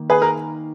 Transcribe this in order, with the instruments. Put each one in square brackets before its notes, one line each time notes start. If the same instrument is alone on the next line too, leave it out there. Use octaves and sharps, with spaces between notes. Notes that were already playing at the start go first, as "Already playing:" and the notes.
Already playing: [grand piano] D#3 A#3
[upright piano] G#4 B4
A#4